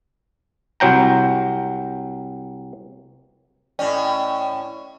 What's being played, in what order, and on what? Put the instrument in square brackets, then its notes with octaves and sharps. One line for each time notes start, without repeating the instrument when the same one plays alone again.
[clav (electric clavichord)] C2 F#3 G5 A#5
[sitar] A2 C#4 [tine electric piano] D5 D#5 G5